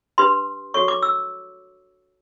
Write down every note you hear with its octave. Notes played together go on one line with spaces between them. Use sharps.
D4 G4 B4 C6
F#4 A4 C#5 C#6
D6
E6